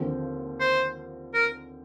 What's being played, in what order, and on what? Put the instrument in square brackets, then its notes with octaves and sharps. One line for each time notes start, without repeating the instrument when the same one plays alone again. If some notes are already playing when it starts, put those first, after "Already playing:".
Already playing: [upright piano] D#2 D3 F3 C4
[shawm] C5
A#4